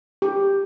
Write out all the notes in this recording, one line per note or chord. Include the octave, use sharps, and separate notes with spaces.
G4